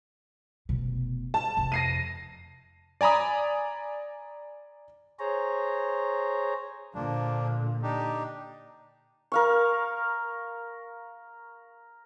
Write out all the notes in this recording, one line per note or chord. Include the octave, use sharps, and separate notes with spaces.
F1 B2
A5
F2 C3
A#6 C7 D#7
D5 G#5 A#5 B5 D#6
G#4 C5 C#5 A#5
A#2 D3 F3 A#3 D4
D4 D#4 G4
A#4 F5 C#6